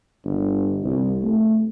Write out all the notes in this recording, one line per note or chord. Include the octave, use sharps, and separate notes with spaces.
G1
C2
A3